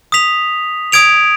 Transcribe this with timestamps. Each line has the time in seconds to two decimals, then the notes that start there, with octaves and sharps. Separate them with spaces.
0.12 D#6 B6 F7
0.92 D#6 G#6 D7 F7